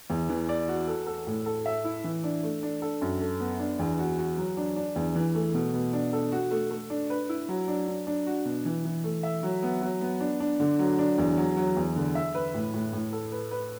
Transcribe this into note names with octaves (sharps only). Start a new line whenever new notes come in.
E2
E3
D5
F#4
A4
A4
A2
A4
E5
E4
E3
D4
A3
D4
A4
F#2
A4
B3
D4
E2
F#4
F#4
F#3
D4
D4
E2
E3
A3
B2
B2
D4
A4
F#4
A3
A3
D4
B4
E4
F#3
D4
D4
D4
F#4
B2
E3
E3
A3
E5
F#3
B3
F#3
B3
D4
D4
D3
F#3
D4
E2
F#3
F#3
E2
D3
E5
B4
A2
A2
A2
A4
B4
B4